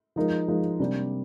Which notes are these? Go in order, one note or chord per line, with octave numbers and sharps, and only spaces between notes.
F3 G#3 D#4 A#4
F3 G#3 D#4 A#4
C3 G3 A#3 D4